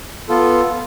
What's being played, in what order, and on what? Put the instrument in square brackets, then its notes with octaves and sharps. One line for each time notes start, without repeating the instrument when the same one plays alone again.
[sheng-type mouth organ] B3 F4 A4